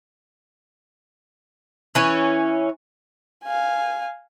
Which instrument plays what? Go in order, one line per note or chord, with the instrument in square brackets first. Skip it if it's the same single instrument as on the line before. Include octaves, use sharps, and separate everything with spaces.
[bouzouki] E3 C#4
[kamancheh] F5 G#5